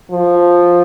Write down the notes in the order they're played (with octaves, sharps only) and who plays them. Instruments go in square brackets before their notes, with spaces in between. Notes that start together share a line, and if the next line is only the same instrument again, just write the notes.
[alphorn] F3